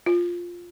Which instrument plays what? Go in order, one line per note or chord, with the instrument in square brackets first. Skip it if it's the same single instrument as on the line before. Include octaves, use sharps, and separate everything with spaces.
[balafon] F4